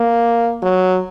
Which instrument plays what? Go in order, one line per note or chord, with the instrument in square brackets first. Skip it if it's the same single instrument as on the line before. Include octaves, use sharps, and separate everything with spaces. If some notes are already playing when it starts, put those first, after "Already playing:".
Already playing: [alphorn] A#3
F#3